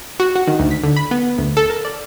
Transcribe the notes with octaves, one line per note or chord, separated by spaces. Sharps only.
F#4
F#4
D#3
D2
B6
D3
B5
B3
D2
A4
A#4
D5